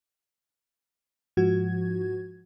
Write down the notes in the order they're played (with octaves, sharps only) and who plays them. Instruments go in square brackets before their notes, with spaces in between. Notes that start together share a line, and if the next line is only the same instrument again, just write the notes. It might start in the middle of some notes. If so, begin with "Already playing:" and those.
[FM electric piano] G#2 F3 F#4 G#6